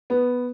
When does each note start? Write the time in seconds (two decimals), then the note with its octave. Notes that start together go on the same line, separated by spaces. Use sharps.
0.10 B3